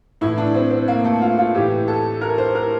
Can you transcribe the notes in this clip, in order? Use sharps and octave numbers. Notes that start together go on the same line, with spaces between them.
A2 E3 E4
D4
C4
C4
A#3
A3
F4
F4
A2 E3 G4
A4
A#4
C5
A#4